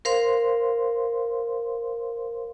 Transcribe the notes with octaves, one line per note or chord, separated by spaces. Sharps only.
A#4 C5 F5 C6